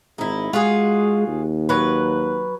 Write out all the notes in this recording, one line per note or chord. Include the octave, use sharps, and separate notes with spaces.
G#1 D#4 E4
G#3 F4 F#4 G#4
D#2
F#3 B4